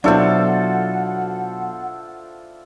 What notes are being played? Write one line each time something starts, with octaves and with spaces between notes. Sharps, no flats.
B2 F#3 D4 E4 F4 A4 C5 F#5